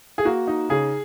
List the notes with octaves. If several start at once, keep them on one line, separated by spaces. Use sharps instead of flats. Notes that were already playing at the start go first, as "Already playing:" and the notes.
G#4
A#3 F#4
D#4
C#3 G#4